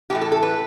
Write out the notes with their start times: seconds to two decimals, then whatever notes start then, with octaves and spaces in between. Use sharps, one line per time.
0.10 A2 E3 A3 G4
0.21 A4
0.32 A4
0.43 B4